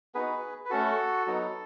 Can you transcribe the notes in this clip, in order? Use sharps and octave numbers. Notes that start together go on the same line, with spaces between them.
B3 D#4 F#4 G#4 B4
B4
A3 C#4 F#4 A4
F#3 B3 D#4 F#4